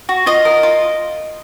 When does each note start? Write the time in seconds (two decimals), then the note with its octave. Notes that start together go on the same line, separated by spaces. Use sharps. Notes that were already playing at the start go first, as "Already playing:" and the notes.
0.09 F#4
0.26 F4 D#5
0.45 A#4
0.63 F4